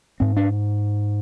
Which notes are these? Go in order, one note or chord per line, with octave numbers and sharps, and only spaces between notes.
G#2 C4
D4